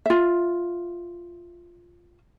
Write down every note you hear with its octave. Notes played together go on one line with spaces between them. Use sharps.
F4 E5